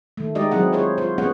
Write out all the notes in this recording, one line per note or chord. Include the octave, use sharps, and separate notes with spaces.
D#3 A3
G#3 D#4 G4 D5 D#5
F#3 C4 E4 G#4 F#5
F4 G#4 C5 C#5
F4 C5
B3 C#4 G#4 C#5 F#5